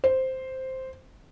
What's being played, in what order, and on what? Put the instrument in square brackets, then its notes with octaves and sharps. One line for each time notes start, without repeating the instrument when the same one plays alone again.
[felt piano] C5